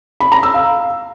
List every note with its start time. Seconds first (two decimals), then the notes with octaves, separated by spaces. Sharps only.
0.20 B5
0.32 A#5
0.43 E6
0.54 F5